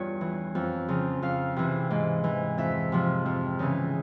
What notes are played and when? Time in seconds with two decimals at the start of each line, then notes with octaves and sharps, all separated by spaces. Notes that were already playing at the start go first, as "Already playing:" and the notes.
Already playing: E2 G2 F4 C#5
0.21 E3
0.55 F2
0.88 C#3 F3
1.22 F2 F5
1.56 C3 E3
1.91 G#2
2.24 E3
2.58 F2 E5
2.92 C3 F3
3.26 F2
3.59 C#3 E3